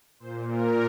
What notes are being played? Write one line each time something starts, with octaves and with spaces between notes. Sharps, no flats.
A#2 C5
A#4